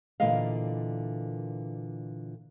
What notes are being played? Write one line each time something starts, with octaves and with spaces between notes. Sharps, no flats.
A#2 D3 E3 A#4 D#5 F5